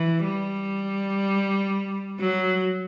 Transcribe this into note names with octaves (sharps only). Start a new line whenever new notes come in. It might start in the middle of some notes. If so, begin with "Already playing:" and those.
Already playing: E3
G3
F#3